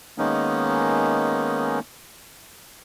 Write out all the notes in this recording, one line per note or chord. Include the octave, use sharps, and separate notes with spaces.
D#3 G#3 A#3 B3 C#4 D#4